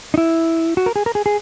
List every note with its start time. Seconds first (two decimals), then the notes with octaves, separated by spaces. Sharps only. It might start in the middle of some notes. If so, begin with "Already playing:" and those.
0.14 D#4
0.18 E4
0.77 F#4
0.86 A#4
0.96 G#4
1.06 A#4
1.15 G#4
1.26 G#4